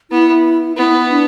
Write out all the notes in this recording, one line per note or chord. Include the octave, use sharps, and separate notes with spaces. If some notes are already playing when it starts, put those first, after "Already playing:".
B3 E4
B3 E4
D4